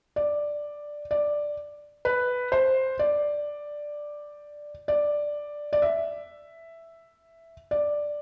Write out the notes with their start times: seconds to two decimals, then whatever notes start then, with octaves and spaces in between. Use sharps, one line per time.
0.16 D5
1.11 D5
2.05 B4
2.52 C5
2.99 D5
4.88 D5
5.73 D5
5.82 E5
7.71 D5